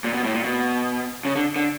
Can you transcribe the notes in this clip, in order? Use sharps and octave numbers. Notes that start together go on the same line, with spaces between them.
A#2
B2
A2
A#2
B2
C#3
D3
D3